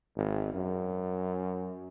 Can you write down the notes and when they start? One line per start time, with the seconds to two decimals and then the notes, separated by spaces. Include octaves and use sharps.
0.16 G#1
0.54 F#2